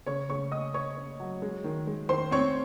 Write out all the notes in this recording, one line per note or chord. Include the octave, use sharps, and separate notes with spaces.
C#3 C#5 C#6
C#3 C#5 C#6
C#4 D#5 D#6
C#4 C#5 C#6
C#4
F#3
G#3
D#3
G#3
D#3 C5 C6
C4 C#5 C#6